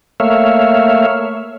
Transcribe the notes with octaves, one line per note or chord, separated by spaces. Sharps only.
A3 A#3 C#5 E5 F5